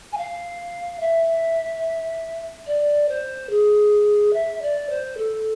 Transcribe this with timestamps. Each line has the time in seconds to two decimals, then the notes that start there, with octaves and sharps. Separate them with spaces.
0.12 G#5
0.17 F5
1.00 E5
2.67 D5
3.08 C5
3.50 G#4
4.33 E5
4.61 D5
4.90 C5
5.17 A4